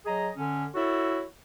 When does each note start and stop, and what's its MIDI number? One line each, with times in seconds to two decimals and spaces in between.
0.06 0.28 54
0.06 0.28 68
0.06 0.28 75
0.06 0.28 82
0.36 0.66 50
0.36 0.66 61
0.74 1.22 64
0.74 1.22 66
0.74 1.22 69
0.74 1.22 73